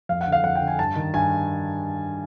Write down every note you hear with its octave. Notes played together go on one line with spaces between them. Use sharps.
F2 F5
F#5
D3
F5
F2 F#5
G5
D3
G#5
G2 A5
D#3
G2 G#5